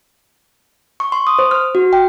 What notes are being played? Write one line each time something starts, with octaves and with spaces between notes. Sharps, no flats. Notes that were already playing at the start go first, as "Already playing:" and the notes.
C#6
C6
D#6
C5
F6
F#4
G5